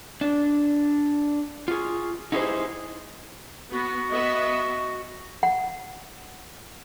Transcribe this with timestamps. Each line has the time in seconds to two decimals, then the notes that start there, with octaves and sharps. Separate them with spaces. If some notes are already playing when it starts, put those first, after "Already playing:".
0.21 D4
1.68 F4 G#4
2.32 D#4 E4 G4 G#4 A#4 C5
3.71 B3 F#4
4.11 B3 D#5 E5
5.43 F#5